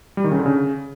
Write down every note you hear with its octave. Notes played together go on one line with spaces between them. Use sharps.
G3
D#3
C#3
D3
C#3